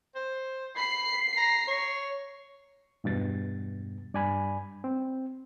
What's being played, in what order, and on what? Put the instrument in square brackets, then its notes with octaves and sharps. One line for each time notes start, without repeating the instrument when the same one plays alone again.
[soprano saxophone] C5
[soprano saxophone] B5 [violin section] C7
[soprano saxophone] A#5
C#5
[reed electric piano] E2 G2 B2 A6
G2 D5 G#5 B5
C4